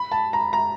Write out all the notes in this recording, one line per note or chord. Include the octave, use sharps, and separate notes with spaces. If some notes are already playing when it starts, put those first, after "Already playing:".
Already playing: B5
A5
A#5
A#5